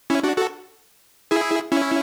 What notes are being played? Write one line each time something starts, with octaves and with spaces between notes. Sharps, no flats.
C#4 E4
D4 F#4
F#4 A4
E4 G#4
C#4 E4